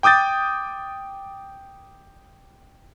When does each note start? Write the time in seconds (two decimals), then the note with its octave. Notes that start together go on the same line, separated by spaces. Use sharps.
0.03 G5 D6 D#6 G6 A6